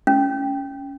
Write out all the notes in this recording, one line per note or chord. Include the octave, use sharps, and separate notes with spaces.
C#4